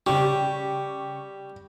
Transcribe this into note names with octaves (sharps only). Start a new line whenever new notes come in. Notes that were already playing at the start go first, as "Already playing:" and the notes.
C#3 G3 G4 C#6